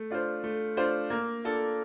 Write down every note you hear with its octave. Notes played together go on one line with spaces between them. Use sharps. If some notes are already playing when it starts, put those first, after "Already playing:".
Already playing: A3
D4 F4 C5
A3
D4 F4 C5
A#3
D4 F4 A4